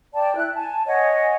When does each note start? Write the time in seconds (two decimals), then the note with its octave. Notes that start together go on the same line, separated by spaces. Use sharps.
0.14 D5 G5 A5
0.36 E4 F#6
0.55 G#5 A5
0.87 C#5 D#5 F#5 G#5